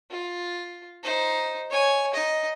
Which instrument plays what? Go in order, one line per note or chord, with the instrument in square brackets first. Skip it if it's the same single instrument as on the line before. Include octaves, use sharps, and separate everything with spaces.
[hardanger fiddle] F4
D#4 C5
C#5 G#5
D#4 D#5